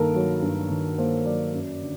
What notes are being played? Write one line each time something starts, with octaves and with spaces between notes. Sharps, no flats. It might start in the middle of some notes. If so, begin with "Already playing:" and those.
Already playing: G2 D#3 A#3 A4 A#4
F#3
G2
D#3
A#3 C5
F#3 D5
F#2
D3